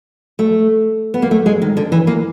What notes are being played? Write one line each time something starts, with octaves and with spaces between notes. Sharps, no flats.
A3
B3
A#3
A3
G#3
D#3
D3
E3
A#3